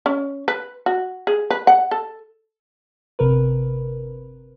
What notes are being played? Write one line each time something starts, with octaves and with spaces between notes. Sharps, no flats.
C#4
B4
F#4
G#4
B4
F#5
A4
G1 C3 A#4 B4